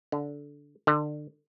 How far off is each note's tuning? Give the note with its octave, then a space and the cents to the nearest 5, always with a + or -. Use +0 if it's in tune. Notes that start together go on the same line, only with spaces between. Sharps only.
D3 -15
D3 +30